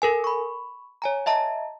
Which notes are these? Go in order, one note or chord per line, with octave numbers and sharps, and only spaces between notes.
A4 A#4 G#5
B5 C#6
C#5 G#5 A#5
D#5 E5 A5 A#5